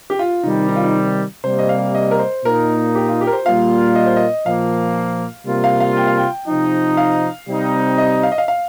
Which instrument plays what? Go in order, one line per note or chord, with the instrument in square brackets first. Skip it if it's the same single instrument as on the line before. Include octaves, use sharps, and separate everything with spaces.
[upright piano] G4
F4
[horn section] C3 D#3 G3 [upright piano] D#4
[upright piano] D#4
F4
D#4
[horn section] C3 G3 A#3 [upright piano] C5
[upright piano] D#5
F5
D#5
A#4
C5
[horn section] A#2 A#3 D#4 [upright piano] A#4
[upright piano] G4
F4
G4
A#4
C5
[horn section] A#2 G3 A#3 F4 [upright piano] F5
[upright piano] D#5
C5
D#5
[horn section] A#2 F3 A#3 [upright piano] F5
[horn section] C3 G3 A#3 F4
[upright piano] F5
F5
G5
F5
G5
[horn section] C3 F3 D#4
[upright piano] F5
[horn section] C3 G3 C4 D#4
[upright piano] D#5
F5
D#5
F5
F5